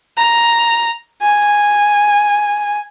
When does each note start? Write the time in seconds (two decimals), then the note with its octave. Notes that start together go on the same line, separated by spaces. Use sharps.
0.17 A#5
1.22 G#5